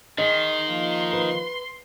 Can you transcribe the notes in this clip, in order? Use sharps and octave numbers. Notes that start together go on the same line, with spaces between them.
D#3 G#4 D#5 C6
F3 A#3
B4